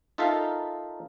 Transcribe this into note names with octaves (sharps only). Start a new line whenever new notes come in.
D#4 F4 A4 A#4 E5 F5